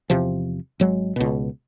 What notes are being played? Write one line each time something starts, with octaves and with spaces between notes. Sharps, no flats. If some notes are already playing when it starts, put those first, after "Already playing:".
E2 C3 F3
G#1 F#3 G#3
C#2 B2